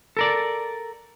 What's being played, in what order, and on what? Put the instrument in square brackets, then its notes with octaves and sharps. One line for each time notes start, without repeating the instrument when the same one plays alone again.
[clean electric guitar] A4 A#4 D5